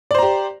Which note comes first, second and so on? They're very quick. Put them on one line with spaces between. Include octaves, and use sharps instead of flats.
D5 C5 A#5 G4